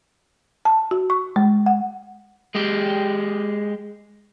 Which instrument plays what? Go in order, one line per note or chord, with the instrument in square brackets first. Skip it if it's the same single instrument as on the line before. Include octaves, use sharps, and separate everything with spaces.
[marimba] A5
F#4
C#6
G#3
F#5
[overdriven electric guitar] G#3 G4